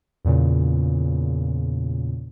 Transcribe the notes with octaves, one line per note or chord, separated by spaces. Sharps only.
E2 A#2 C#3